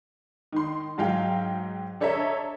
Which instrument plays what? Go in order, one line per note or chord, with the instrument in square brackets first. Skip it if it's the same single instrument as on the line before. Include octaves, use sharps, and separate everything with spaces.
[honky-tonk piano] D#3 C6
G#2 F#3 F5 G5
D4 A4 C#5 D#5 E5 A#5